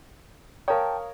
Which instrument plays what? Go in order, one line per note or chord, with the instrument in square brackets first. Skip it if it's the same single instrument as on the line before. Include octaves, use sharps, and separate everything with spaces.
[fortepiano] A#4 C#5 [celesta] F5 A#5 D#6 [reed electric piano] G5 A5